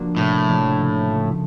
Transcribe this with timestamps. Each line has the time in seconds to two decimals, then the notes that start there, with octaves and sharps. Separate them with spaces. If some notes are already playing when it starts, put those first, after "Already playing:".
Already playing: F3 A#3 D4 F#4
0.16 A2 C3
0.46 F3 A#3 D4 F#4
0.78 C#3
1.10 F3 A3